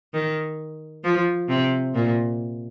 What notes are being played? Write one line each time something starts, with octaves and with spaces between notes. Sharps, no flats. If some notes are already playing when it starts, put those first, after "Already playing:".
D#3
F3
C3
A#2